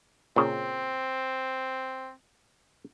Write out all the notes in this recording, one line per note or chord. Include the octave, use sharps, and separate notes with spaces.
A#2 C#3 C4